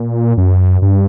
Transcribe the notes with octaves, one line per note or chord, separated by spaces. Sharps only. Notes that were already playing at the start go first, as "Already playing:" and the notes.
Already playing: A#2
F#2
G2